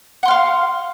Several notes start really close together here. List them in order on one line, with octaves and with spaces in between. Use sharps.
F#5 C6 F6 F5